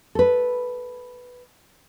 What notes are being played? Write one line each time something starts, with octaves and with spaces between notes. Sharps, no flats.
A4 B4